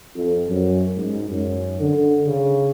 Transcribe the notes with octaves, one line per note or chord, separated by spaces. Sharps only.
F2
F#2
G#2
F#2
D3
C#3